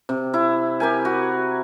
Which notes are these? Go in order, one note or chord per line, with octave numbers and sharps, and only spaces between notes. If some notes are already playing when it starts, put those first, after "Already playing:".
C3
E4
G4 A#4 G#5
F#4